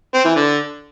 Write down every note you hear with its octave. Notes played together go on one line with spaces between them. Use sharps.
C4
E3
D3